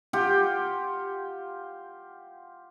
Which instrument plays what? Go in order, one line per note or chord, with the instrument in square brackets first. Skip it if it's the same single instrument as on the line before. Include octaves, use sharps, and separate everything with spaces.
[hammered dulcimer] F4 G4 F#5 G5